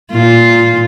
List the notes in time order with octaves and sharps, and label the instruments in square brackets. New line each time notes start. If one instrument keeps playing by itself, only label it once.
[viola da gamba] A#2 F4